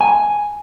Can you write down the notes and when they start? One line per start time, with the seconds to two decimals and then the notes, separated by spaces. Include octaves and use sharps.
0.01 G#5